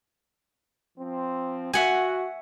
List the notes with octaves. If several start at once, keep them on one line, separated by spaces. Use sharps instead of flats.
F3 C4
F#4 E5 F#5 G#5